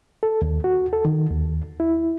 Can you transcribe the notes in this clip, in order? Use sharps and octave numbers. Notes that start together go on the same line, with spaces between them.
A4
D#2
F#4
A4
D#3
D#2
E4